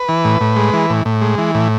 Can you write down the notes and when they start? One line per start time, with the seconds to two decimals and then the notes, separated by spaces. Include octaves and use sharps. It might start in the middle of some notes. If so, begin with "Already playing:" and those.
Already playing: B4
0.09 E3
0.25 A2
0.41 A2
0.56 G#3
0.74 E3
0.90 A2
1.05 A2
1.22 G#3
1.38 E3
1.55 A2